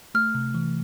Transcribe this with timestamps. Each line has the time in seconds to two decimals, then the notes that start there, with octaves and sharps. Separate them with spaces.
0.15 A3 F6
0.35 C3
0.54 E3